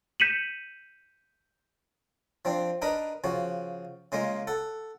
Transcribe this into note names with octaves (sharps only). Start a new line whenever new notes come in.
G6 B6 C#7 D#7 E7 F#7
F3 C4 D4
D4 D#4 A#4 B4 B5
C#3 F3 F#4
C#3 G#3 A#3 F4
A4 F#5